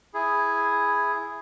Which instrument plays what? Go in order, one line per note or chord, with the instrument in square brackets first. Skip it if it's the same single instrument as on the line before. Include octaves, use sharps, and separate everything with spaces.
[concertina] E4 G#4